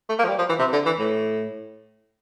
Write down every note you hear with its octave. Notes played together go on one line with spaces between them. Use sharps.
A3
A#3
F3
G3
F3
E3
C3
D3
E3
A2